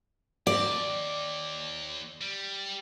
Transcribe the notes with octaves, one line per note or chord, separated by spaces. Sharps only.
D#2 D5
G3